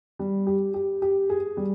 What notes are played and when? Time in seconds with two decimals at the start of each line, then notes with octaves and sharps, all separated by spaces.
0.19 G3
0.47 G4
0.74 G4
1.02 G4
1.30 G#4
1.57 G3